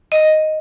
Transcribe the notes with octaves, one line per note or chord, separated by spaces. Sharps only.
D#5